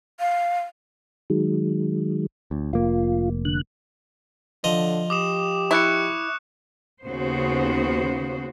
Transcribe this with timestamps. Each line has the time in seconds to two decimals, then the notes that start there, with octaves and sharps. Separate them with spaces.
0.20 F5
1.30 D#3 F#3 G#3
2.51 D2
2.73 F1 A#3 F4
3.45 D3 F#6
4.64 D3 F3 D#5
5.10 G4 D6 D#6 E7
5.71 E4 C#6 F#6 C#7
7.04 D#2 C#3 B3 F#4 C5